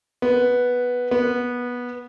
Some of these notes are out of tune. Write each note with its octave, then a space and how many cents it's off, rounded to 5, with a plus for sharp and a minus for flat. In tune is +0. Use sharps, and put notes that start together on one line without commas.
B3 -5
B3 -15